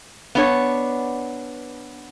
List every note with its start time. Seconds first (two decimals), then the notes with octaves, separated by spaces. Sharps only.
0.35 B3 D4 C#5